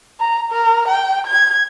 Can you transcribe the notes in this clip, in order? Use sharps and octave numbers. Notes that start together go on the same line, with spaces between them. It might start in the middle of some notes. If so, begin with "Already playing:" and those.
A#5
A#4
G5
G#6